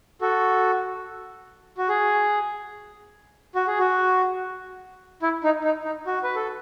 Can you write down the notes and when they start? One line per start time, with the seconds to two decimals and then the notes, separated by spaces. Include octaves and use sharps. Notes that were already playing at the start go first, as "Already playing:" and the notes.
0.21 F#4 A4
1.78 F#4
1.89 G#4
3.55 F#4
3.67 G#4
3.79 F#4
5.22 E4
5.44 D#4
5.64 D#4
5.85 D#4
6.06 F#4
6.23 B4
6.36 A4